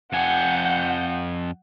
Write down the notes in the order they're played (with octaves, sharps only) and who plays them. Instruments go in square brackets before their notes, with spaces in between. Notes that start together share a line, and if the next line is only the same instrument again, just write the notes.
[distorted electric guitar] F2 G#5 [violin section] F#5 G6